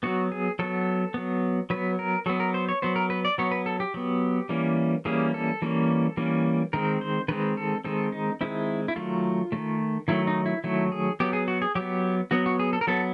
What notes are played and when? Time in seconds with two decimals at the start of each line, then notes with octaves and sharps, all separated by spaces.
0.03 F#3 B3 F#4
0.32 G#4
0.59 F#3 B3 A4
1.14 F#3 B3
1.70 F#3 B3 B4
1.99 A#4
2.26 F#3 B3 A4
2.40 A#4
2.54 C5
2.69 C#5
2.82 F#3 B3 C5
2.96 A#4
3.10 B4
3.25 D5
3.38 F#3 B3 C#5
3.51 B4
3.66 A4
3.80 G4
3.94 F#3 B3
4.49 E3 G3 A#3 C#4
5.05 E3 G3 A#3 C#4 G#4
5.34 A4
5.62 E3 G3 A#3 C#4
6.17 E3 G3 A#3 C#4
6.73 D#3 G#3 C4 A#4
7.01 C5
7.28 D#3 G#3 C4 B4
7.57 A4
7.84 D#3 G#3 C4 A4
8.12 D#4
8.41 D#3 G#3 C4 E4
8.88 E4
8.96 D#3 F#3 A3 F4
9.52 D#3 F#3 A3
10.08 D#3 F#3 A3 E4
10.27 D#4
10.46 E4
10.64 D#3 F#3 A3 E4
10.92 G#4
11.20 F#3 B3 G4
11.33 G#4
11.48 F#4
11.62 G#4
11.75 F#3 B3 G4
12.31 F#3 B3 F#4
12.46 F#4
12.60 G#4
12.73 A4
12.81 A#4
12.87 F#3 B3 A4